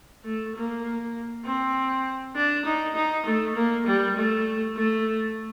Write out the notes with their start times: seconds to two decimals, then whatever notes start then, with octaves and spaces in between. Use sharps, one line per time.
0.25 A3
0.56 A#3
1.45 C4
2.36 D4
2.65 D#4
2.95 D#4
3.26 A3
3.55 A#3
3.87 G3
4.17 A3
4.76 A3